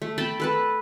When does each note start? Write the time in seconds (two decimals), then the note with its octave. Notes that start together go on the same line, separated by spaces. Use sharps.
0.02 A3
0.18 G5 A5 B5
0.40 A4 B4 A5